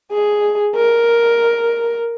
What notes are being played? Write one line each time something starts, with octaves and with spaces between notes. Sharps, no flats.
G#4
A#4